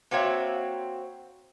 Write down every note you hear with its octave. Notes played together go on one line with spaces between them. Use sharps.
A#3 C4 F#4 C#5 E5